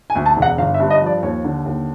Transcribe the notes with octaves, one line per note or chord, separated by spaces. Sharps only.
G#5
D2
A5
E1
F#5
G1 F5
E5
G2
D#5
F3
D5
D#2 C#5
D3
D#2